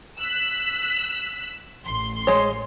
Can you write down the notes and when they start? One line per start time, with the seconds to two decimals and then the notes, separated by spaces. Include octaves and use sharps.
0.19 E6 F#6 B6
1.84 A1 C6
2.27 G#3 C#5